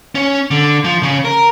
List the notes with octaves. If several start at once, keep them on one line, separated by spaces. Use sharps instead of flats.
C#4
D3
F3
C#3
A#4